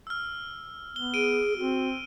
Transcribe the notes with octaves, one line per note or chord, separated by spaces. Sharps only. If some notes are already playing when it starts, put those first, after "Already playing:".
E6 F6
B3 G7
G#4 D7 D#7
C4 F#4